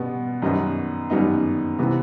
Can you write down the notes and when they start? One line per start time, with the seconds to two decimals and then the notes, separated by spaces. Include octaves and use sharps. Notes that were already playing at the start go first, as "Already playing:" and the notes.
Already playing: B2 G3 B3
0.42 F#2 D#3 G3 B3 D#4
1.10 F#2 D#3 G3 B3 D#4
1.79 C3 E3 B3